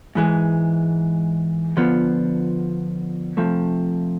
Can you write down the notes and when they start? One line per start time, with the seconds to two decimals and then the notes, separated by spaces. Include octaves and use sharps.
0.15 G#2 E3 G#3
1.77 D3 F3 B3 F4
3.37 C3 F3 A3